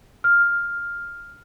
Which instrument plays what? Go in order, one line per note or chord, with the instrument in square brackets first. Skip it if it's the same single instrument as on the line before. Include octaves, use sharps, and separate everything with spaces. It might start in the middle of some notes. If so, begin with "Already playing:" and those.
[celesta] F6